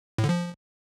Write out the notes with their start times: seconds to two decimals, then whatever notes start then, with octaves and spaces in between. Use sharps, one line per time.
0.18 A2
0.24 D3
0.29 F3